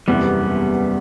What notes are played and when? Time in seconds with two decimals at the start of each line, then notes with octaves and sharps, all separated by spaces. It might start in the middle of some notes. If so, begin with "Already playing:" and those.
0.08 F#1 E2 C3 G3 B3